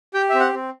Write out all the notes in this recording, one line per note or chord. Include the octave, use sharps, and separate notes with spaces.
G4 G5
C4 E5
F#5
C4